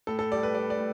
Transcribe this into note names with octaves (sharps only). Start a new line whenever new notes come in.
A2 A4
A4
G3 D5
B4
G3 D5
D5
A2